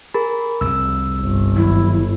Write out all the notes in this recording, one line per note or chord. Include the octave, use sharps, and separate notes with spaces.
G#4 A#4 B5
C2 F2 E6
G1
G#1 F#3 E4